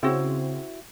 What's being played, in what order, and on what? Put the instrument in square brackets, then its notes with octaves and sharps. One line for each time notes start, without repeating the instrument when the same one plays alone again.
[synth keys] C#3 C4 [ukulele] E4 F#4